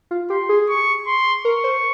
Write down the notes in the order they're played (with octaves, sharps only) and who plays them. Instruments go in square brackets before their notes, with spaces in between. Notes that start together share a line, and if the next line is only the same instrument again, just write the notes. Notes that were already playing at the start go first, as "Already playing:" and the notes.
[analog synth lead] F4
[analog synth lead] G4 [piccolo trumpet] C6
[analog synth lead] G#4
[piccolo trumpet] C#6
C6
[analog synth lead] A#4 [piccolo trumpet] C#6
[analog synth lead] C5